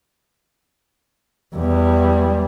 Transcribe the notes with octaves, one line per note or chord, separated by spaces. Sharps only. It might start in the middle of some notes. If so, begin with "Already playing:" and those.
E2 G3